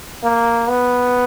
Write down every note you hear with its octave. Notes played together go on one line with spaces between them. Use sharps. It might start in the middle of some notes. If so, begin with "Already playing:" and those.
A#3
B3